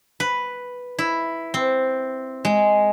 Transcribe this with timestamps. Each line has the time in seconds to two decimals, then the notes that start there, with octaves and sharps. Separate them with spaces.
0.20 B4
0.99 E4
1.54 C4
2.45 G#3